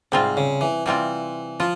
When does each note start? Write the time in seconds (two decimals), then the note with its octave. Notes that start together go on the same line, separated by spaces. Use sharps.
0.12 G#2 C3 G3 C4 F4
0.37 C#3
0.61 E3
0.86 C3 E3 G3 C4 F4
1.60 F3 F4